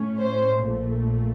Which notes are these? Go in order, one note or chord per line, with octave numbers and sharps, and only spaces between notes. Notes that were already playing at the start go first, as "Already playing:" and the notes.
Already playing: A2 A3 C#4
C5
A#1 A#2 A3